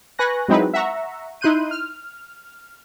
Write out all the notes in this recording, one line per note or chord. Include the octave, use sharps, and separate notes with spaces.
B4 G#5 C#6 F#6 A#6
F#3 G#3 C4 D#4 E4 B4
E5 F#5 A#5 C#6
D#4 E4 C6 F#6 G6 D#7
F6